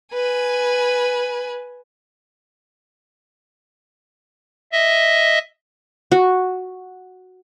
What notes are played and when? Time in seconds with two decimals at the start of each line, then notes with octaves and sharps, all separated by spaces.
0.13 B4 G#5
4.72 D#5 E5
6.12 F#4